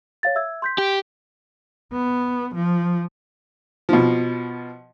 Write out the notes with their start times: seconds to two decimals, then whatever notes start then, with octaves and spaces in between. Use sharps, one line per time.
0.23 C#5 F5 A6
0.35 E5 E6 G#6
0.62 C6 G6 B6
0.78 G4
1.93 B3
2.55 F3
3.89 B2 F3